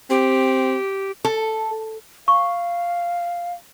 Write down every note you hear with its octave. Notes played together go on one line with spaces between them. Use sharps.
C4 G4
A4
F5 C#6